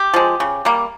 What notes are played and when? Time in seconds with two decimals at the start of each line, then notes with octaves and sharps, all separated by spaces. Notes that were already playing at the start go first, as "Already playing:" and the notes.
Already playing: G4
0.14 F3 G#3
0.40 C#3
0.65 G3 A#3